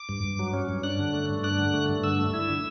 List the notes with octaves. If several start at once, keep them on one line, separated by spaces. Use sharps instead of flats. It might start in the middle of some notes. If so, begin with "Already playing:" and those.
Already playing: D6
G2
G2
F#3
C#4
G2
D4 F#6
D3
A3
G2
D4 F#6
D3
A3
G2
D3 E6
A3
E4
D3